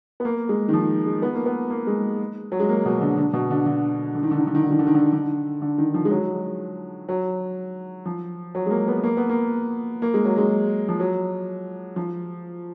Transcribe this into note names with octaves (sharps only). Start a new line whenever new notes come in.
B3
A#3
G#3
D#3
F3
G#3
B3
A#3
B3
A#3
G#3
F#3
G#3
A#3
B2
D3
D3
B2
D3
D3
D3
D#3
D3
D#3
D3
D#3
D3
D#3
D3
D#3
D3
D3
D3
D#3
F3
G#3
F#3
F#3
F3
F#3
G#3
A#3
B3
A#3
B3
A#3
A#3
G#3
F#3
G#3
F3
F#3
F3